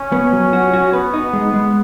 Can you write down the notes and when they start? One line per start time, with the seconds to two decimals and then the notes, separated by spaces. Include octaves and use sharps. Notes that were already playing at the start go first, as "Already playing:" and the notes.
Already playing: C#4
0.12 B3
0.33 F#3
0.53 F#4
0.73 F#4
0.93 B3 B4
1.14 D#4
1.33 G#3
1.54 G#3